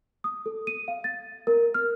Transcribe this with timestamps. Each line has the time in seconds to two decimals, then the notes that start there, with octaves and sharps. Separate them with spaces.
0.24 D#6
0.46 A4
0.67 D#7
0.88 F5
1.04 A6
1.47 A#4
1.74 F6